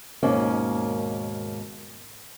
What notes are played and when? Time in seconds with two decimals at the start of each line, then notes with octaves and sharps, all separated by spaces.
0.23 D#2 G#2 B2 A#3 C#4